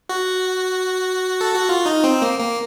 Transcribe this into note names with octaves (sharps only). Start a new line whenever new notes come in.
F#4
A4
F#4
F4
D#4
C4
A#3
A#3